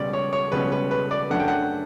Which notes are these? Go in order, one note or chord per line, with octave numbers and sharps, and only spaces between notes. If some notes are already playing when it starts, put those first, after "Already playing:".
Already playing: C#2 B2 G3 C#4 D5
C#5
C#5
C#2 B2 G3 C#4 B4
B4
B4
D5
F#2 D3 A3 D4 F#5
G5
F#5